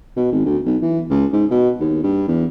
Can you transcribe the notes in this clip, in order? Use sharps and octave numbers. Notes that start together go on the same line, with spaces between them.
B2
G#1
D2
B1
E3
C#2
G#2
B2
D#2
G2
E2